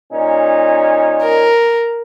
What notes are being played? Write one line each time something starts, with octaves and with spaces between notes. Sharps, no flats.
A#2 C#4 D#4
A#4